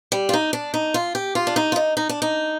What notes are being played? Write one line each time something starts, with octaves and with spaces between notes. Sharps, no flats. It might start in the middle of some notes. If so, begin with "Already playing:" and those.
G3
F4
D#4
D4
D#4
F4
G4
F4
D4
D#4
F4
D#4
D#4
D4
D#4